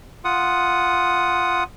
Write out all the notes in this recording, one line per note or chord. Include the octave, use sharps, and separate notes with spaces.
F4 F#5 D#6